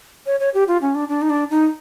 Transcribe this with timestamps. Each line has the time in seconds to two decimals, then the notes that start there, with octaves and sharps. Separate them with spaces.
0.26 C#5
0.40 C#5
0.54 G4
0.68 F4
0.82 C#4
0.95 D4
1.09 D4
1.22 D#4
1.30 D4
1.51 D#4